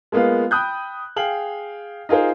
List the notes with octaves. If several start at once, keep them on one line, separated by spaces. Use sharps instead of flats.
G#3 A#3 B3 F4 F5
G5 B5 D#6 F#6 G6
G#4 F5 G5 F#7
D#4 F4 G#4 A#4 C5